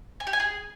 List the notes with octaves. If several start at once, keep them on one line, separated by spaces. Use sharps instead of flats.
G#5
G4
G#5
G#4